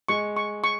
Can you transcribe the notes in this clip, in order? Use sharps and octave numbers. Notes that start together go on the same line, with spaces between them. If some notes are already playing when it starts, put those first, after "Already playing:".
G#3 C#6
C#6
C#6